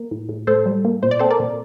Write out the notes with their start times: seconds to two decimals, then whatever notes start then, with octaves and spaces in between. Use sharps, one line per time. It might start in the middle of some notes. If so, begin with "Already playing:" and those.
Already playing: A#3
0.11 A2
0.29 A2
0.47 A2 A4 C5
0.66 G3
0.85 A#3
1.03 A#2 C5
1.11 D5
1.19 C4 A4 C5
1.30 A#4 D5
1.40 A#2